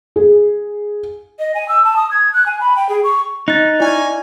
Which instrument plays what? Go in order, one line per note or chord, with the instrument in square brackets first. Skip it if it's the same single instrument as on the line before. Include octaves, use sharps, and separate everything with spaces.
[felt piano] G#4
[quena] D#5
G#5
E6
A5
D#6
G#6
F#6
G#5
B5
G5
G#4
C#6
[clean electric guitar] D#4 [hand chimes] F#6 A6
[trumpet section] C#4 G#5 [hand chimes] E4 D5